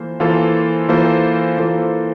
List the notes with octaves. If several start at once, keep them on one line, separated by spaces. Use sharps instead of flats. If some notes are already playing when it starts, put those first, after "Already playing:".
Already playing: E3 A#3 F4 A4 C5
E3 A#3 F4 A4 C5
E3 A#3 F4 A4 C5
E3 A#3 F4 A4 C5